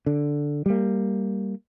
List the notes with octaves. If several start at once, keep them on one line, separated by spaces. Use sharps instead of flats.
D3
G3 A#3